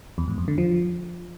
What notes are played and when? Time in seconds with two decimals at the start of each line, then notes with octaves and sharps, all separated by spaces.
0.18 E2
0.28 G#2
0.38 F2
0.48 D3
0.58 F3